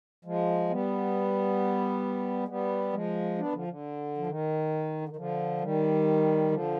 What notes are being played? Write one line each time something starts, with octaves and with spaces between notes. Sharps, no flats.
F3 G#3
G3 B3
G#3
G3 B3
F3 G#3
B3 D4
D3 F3
D3
F3
D#3
D3
D#3
D3 F3
D#3 G3
D3 F3